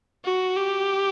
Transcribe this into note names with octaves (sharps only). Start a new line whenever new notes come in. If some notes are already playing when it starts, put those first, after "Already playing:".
F#4
G4